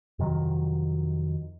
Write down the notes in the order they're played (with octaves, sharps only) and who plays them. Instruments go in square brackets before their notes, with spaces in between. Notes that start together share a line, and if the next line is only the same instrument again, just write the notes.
[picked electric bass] F2 C3 D#3 F#3